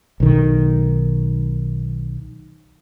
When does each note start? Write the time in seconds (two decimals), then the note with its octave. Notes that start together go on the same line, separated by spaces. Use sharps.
0.20 B1 D#3